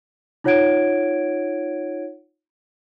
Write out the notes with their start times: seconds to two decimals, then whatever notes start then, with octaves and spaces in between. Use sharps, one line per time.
0.44 D#4 F4 C#5 F#5 G#6 D7